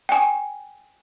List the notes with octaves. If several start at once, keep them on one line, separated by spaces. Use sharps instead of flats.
G5 G#5